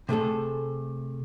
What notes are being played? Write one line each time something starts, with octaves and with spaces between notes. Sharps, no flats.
C3 A3 G#4 A4